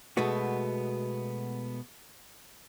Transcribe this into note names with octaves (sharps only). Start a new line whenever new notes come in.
B2 G#3 A3 B3 F#4